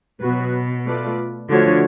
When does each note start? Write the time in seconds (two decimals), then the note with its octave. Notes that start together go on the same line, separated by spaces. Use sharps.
0.22 B2 F#3 B3 F#4 B4
0.86 A3 F4 B4 D5
1.49 D3 F3 A3 D4 F#4 C#5